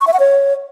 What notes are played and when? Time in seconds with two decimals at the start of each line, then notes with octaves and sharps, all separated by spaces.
0.01 C#6
0.07 E5
0.13 F#5
0.20 C#5